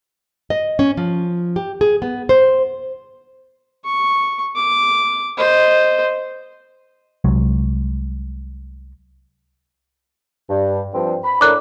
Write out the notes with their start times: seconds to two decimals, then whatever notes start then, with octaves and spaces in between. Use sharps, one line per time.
0.50 D#5
0.79 C#4
0.97 F3
1.56 G4
1.81 G#4
2.02 B3
2.29 C5
3.85 C#6
4.56 D6
5.38 C5 D#5
7.24 C2 F#3 G#3
10.50 G2
10.94 G2 F3 C4
11.24 B5
11.41 A2 D4 A#4 D6 F#6